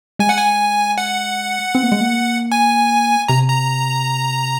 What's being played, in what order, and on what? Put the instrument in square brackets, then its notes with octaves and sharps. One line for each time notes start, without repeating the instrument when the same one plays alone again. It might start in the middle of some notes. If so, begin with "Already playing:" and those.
[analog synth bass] G#3 [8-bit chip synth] G#5
[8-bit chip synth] F#5
G#5
F#5
[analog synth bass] C4
A#3
G#3
A#3
[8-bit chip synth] G#5
[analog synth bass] C3 [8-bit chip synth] A#5
[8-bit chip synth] A#5